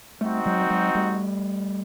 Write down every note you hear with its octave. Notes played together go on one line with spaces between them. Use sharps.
G3 A3 C4 D#4 F#4
F#3 G#3
G3
F#3 G#3
G3 A3